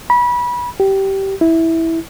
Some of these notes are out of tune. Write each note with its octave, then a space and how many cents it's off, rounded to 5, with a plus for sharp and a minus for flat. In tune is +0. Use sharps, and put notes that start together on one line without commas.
B5 -25
G4 -15
E4 -10